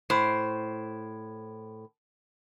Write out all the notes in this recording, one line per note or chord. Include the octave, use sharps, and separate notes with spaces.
A2 C5